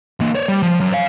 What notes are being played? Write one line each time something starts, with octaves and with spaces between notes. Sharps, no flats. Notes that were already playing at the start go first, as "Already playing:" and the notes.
E3 A#3
C#5 D5
G3
F3
F#2
C#5 F5